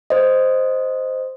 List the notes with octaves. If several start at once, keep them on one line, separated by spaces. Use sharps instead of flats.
C5 D#5